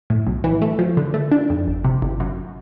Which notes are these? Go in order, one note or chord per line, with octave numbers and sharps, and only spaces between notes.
A2
B1
E3
A3
F3
D3
A3
D4
F2
G1
C3
G1
F#2